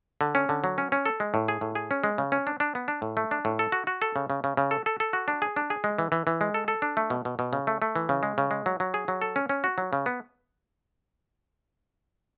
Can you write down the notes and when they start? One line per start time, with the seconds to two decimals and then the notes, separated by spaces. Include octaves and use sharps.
0.21 D3
0.35 C#4
0.49 D3
0.64 F#3
0.78 C#4
0.92 C#4
1.06 A4
1.20 G#3
1.34 A2
1.48 G#4
1.61 A2
1.75 G#4
1.91 C#4
2.04 G#3
2.18 C#3
2.32 C#4
2.47 D4
2.60 D4
2.75 B3
2.88 D4
3.02 A2
3.17 A3
3.31 D4
3.45 A2
3.59 A4
3.72 F#4
3.87 F#4
4.02 A4
4.16 C#3
4.30 C#3
4.44 C#3
4.57 C#3
4.71 A4
4.86 A4
5.00 A4
5.13 F#4
5.28 D4
5.42 G#4
5.56 D4
5.70 G#4
5.84 G#3
5.98 E3
6.12 E3
6.27 E3
6.41 G#3
6.54 A4
6.68 A4
6.82 D4
6.97 A3
7.10 B2
7.25 B2
7.39 B2
7.53 C#3
7.67 A3
7.82 A3
7.96 E3
8.09 C#3
8.23 G#3
8.38 C#3
8.51 G#3
8.66 F#3
8.80 F#3
8.94 G#4
9.08 F#3
9.22 A4
9.36 C#4
9.49 C#4
9.64 F#4
9.78 F#3
9.93 C#3
10.06 B3